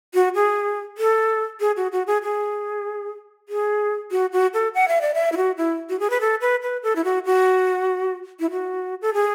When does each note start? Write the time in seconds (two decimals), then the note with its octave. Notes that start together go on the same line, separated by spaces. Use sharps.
0.14 F#4
0.35 G#4
0.98 A4
1.60 G#4
1.77 F#4
1.92 F#4
2.07 G#4
2.23 G#4
3.49 G#4
4.11 F#4
4.32 F#4
4.54 A4
4.74 F#5
4.88 E5
5.01 D5
5.14 E5
5.32 E4
5.37 F#4
5.57 E4
5.89 F#4
6.00 G#4
6.10 B4
6.21 A4
6.41 B4
6.62 B4
6.83 A4
6.96 E4
7.04 F#4
7.25 F#4
8.40 E4
8.51 F#4
9.02 A4
9.14 G#4